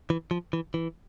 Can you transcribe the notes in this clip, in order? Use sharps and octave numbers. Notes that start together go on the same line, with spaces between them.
E3
F3
E3
E3